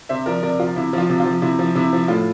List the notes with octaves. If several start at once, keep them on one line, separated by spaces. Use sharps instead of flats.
C3 C5 E5
F3 A#4 D5
C3 A#4 D5
F3 F4
C3 E4
F3 F4
C3
F4
F3
C3 E4
F3
C3 E4
F3
A2 F4